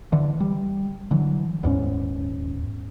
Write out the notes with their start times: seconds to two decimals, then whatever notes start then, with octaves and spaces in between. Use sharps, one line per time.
0.12 D3 E3
0.40 G3
1.11 D3 E3 F#3
1.63 D#1 E2 G#2 C#4